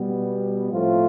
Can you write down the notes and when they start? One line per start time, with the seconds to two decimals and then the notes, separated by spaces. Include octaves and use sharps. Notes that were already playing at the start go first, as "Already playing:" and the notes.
Already playing: B2 G3 B3
0.72 A2 F3 A3 C4 F4